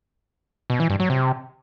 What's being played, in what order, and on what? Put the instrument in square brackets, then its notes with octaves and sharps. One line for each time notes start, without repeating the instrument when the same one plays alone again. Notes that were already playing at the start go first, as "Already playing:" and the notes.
[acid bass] B2
E3
G2
F#3
C3